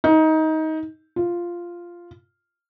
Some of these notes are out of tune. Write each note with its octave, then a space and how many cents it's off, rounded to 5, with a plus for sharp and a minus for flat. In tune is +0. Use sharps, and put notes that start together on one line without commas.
D#4 +20
F4 -5